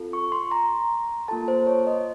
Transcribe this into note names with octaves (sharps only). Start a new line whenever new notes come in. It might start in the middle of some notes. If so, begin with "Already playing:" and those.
Already playing: C4 F4 A4
C#6
C6
A#5
A#3 F4 A4 A5
C5
C#5
D#5